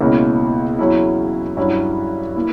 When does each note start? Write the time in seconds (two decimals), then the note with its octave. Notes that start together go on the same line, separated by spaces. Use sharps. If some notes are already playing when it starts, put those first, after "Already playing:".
0.01 C#2 B2 A#3 C#4 E4
0.79 E2 C#3 F#3 C#4 E4
1.57 G2 F#3 C#4 E4
2.36 A#3 E4